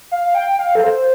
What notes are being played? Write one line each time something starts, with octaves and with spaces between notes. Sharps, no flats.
F5
G5
F5
A4
C5